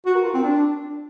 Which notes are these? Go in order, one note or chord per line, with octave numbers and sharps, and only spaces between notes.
F#4
A#4
F4
C4
D4